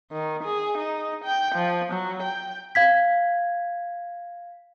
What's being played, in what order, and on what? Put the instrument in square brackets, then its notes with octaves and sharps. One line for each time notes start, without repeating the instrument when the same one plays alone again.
[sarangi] D#3
G#4
D#4
G5
F3
F#3
G5
[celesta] F5 G#6 B6